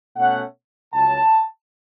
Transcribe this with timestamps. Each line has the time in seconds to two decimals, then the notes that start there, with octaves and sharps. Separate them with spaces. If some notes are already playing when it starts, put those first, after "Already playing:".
0.16 B2 A3 C#4 F#5
0.92 C#2 C#3 F#3 C#4 A5